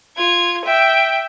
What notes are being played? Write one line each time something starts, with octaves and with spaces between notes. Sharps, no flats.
F4 G#6
E5 G5